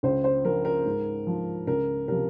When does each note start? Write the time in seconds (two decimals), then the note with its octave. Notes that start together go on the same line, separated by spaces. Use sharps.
0.03 C#2 C5
0.24 C5
0.44 C#3 F3 A#4
0.65 A#4
0.85 G#2
1.27 F3
1.67 C#2 A#4
2.08 C3 F3 A#4